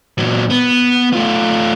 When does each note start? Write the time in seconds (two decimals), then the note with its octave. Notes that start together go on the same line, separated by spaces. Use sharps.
0.18 A#2 F#3
0.50 B3
1.13 A3 F4